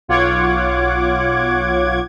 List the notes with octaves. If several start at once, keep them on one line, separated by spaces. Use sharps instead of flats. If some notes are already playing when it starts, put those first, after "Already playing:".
B1 F4 C#5 F#5 D6 G#6